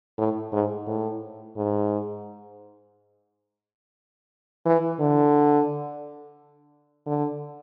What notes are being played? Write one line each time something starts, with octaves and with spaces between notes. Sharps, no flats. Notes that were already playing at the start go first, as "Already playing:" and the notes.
A2
G#2
A2
G#2
E3
D3
D3